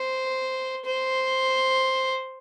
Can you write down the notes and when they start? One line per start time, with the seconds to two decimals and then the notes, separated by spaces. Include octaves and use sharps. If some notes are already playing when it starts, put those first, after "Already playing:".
Already playing: C5
0.86 C5